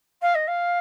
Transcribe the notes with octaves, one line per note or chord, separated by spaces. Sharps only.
F5
D#5
F5